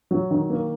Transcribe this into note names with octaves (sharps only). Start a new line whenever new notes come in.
F#3
D#3
A#3